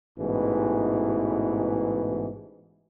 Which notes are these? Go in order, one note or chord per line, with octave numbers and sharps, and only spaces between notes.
A1 G#2 B2 E3